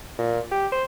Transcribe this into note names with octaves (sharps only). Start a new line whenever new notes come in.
A#2
G4
C5